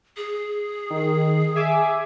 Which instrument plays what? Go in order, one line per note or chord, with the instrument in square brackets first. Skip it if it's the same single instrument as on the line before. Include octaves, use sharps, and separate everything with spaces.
[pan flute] G#4
[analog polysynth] D#3
E5 G#5 D6